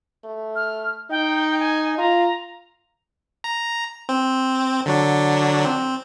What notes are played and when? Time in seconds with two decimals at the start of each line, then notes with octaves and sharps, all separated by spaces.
0.24 A3
0.56 F6
1.11 D#4 G5
1.60 G#5
1.98 F4 A#5
3.44 A#5
4.09 C4
4.86 D3 F#3 D4
5.65 C4